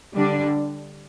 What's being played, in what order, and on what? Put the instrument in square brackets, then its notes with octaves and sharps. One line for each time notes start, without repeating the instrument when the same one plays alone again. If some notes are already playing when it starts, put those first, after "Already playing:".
[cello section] D3 G3 D4